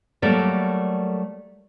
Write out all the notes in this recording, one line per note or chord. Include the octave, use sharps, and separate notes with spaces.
F#3 G3 A3 A#3 A4 D5